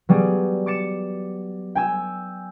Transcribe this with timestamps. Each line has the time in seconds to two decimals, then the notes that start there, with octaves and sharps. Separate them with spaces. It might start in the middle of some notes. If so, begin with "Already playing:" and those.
0.09 F#3 G3 B3 G#4
0.66 D6 A6 C#7 E7
1.75 G5 G#5 E6